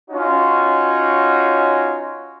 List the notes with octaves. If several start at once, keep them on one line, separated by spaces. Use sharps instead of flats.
C#4 D#4 F4 F#4 C#5